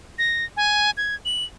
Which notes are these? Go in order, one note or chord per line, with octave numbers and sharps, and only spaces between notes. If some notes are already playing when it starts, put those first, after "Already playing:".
A#6
G#5
G#6
F#7